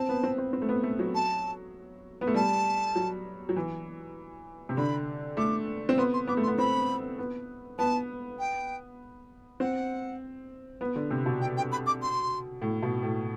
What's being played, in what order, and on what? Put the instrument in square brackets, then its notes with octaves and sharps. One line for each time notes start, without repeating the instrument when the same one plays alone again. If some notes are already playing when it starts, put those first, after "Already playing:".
Already playing: [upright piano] C4 [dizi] A5
[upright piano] B3
C4
C4
C4
A3
B3
A3
F#3
[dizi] A5
[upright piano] B3
A3
[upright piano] G3 [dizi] A5
[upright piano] F#3
F#3
E3
C3
[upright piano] D3 [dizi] B5
[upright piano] A3 [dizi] D6
[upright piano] C4
[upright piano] B3 [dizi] C6
[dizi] C6
[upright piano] B3 [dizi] D6
[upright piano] A3
[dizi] C6
[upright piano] B3
[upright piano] C4 [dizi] B5
[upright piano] B3
[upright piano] B3 [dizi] A5
[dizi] G5
[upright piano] C4 [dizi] F#5
[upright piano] B3
D3
C3
B2
[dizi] G5
G5
B5
D6
C6
[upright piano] A2
B2
A2